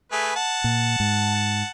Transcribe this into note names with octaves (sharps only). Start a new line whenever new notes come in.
A3 G#4 B4
F#5 A5
A#2
G#2